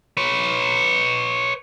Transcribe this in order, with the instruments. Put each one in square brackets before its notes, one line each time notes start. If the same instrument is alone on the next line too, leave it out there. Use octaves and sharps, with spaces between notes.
[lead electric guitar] B4 C#5